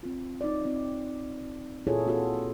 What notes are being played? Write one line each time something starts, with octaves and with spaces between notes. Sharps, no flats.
C4 F4
D#4 D5
C4 D#4
A#2 E4 F4 G#4 A4 C#5
A#3 C4 F4 F#4 G#4 A4